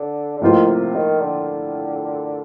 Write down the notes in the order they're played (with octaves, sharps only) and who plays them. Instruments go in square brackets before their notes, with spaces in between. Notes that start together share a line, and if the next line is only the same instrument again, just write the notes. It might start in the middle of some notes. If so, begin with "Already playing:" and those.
Already playing: [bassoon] D3
D3
[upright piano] A2 F3 A#3 F4 C5 [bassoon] D#3
[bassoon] C3
D#3
D3